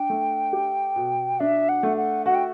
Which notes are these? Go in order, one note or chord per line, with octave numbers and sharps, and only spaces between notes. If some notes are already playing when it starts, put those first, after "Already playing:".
Already playing: D4 G5
A3
G4
B2
D4 E5
F#5
A3
F#5
F#4 F#5
G5